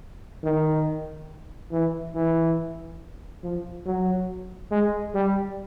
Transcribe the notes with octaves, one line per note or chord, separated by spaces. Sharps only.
D#3
E3
E3
F3
F#3
G#3
G3